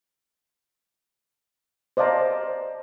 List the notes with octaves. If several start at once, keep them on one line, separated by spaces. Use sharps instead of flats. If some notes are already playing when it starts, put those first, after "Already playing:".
C5 D5 D#5 F5 A5 A#5